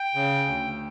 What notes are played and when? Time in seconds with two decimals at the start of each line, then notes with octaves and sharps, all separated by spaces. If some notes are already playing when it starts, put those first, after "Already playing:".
Already playing: G5
0.15 C#3
0.46 D2